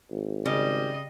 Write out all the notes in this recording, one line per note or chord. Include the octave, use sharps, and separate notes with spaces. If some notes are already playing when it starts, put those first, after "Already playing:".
G#1
C#3 G3 G#4 D#5